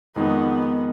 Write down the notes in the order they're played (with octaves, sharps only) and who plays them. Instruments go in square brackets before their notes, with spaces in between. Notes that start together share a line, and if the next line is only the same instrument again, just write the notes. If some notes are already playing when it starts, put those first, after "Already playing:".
[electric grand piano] F2 D#3 G#3 D#4 [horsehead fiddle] B3